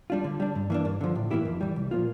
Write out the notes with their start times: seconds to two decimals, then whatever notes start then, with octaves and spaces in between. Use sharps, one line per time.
0.10 G3 D4 F4
0.24 D3
0.40 G3 D4
0.55 G2
0.70 E3 A#3 D4
0.85 G2
1.01 D3 F3
1.15 A2
1.31 E3 A#3 E4 G4
1.45 F2
1.61 E3 G3
1.76 C2
1.91 A#2 F3 A#3 F4